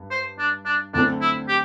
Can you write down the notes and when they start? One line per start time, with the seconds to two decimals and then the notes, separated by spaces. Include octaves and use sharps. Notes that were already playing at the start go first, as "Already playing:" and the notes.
Already playing: G2
0.11 C5
0.39 D4
0.66 D4
0.94 D2 D3 C4 D4 A4
1.22 E4
1.49 G4